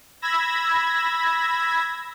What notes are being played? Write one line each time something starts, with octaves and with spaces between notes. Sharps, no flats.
B5 E6 G#6 A#6